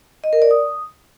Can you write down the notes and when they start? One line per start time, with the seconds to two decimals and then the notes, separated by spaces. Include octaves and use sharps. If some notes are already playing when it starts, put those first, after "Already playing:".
0.24 D#5
0.33 A#4
0.42 D5
0.51 D#6